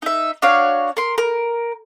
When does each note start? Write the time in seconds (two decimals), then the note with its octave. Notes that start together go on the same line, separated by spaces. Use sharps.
0.02 D#4 E5
0.42 D4 F#4 C#5 F5
0.97 A#4 C6
1.18 A#4